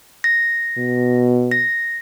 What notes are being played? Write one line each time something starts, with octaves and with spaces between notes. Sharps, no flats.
A#6
B2
A#6